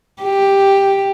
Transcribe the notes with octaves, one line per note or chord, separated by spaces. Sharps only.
G4